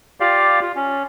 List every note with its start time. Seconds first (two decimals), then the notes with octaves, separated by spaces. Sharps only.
0.20 F4 G4 D5 F5
0.62 F4
0.76 C#4